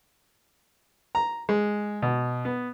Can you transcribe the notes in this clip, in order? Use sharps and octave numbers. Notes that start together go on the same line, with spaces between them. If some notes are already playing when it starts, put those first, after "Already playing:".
A#5
G#3
B2
B3